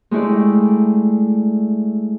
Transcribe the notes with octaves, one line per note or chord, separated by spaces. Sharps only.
G#3 A3 E4 G4 D5